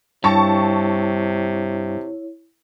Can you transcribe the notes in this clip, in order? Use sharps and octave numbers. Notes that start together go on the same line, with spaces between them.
G2 C3 E4 C#5 A5 C#6